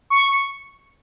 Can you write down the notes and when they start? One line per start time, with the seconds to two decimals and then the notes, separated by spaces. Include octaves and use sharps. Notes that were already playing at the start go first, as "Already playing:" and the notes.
0.10 C#6